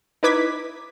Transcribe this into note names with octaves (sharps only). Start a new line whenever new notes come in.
D#4 E4 B4 D6 G#6 B6